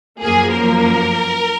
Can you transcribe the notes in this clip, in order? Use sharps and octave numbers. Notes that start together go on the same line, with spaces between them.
F#2 F3 A#3 G#4
A#4